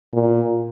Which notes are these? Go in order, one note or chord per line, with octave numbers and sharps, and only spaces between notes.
A#2